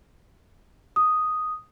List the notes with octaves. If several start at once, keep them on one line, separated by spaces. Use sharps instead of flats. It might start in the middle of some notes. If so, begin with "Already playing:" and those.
D#6